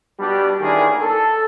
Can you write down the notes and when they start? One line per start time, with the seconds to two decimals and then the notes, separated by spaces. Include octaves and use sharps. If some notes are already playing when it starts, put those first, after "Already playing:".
0.19 B2 G3 D4 G4
0.60 A2 D#3 E3 A#3 D4 G#4
1.00 A4